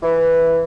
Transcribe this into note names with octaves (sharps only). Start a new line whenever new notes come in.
E3